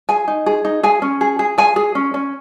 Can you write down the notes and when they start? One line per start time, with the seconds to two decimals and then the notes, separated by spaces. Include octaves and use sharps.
0.09 G#4 G#5
0.28 D#4
0.46 G#4
0.65 D#4
0.83 G#4 G#5
1.02 C#4
1.21 G#4
1.39 G#4
1.58 G#4 G#5
1.76 G#4
1.95 C#4
2.14 C#4